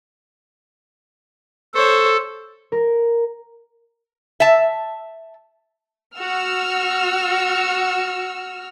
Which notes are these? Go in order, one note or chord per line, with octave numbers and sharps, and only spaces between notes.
A4 C5 C#5
A#4
E5 A5
F#4 E6 F6